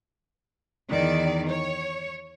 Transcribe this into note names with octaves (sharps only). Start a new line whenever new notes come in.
E2 D#3 D5
C#5